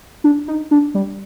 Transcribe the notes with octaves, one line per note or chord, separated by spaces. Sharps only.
D4
D#4
D4
G3